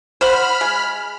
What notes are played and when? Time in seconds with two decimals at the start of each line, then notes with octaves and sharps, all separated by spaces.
0.21 C5 F#5 B5 F6
0.61 G#3